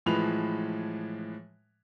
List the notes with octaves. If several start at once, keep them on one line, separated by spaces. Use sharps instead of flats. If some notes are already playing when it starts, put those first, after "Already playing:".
A2 E3 F3 G#3 B4 F7